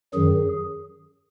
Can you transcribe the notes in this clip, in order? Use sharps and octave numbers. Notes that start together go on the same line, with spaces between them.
F#2 D#3 F#3 G#4